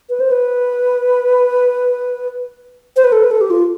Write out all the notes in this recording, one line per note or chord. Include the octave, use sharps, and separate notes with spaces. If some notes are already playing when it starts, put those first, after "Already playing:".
B4
C5
B4
C5
B4
A4
B4
A4
G4
F4